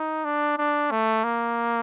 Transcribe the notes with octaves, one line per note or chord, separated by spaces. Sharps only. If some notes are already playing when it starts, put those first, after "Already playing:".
Already playing: D#4
D4
D4
A3
A#3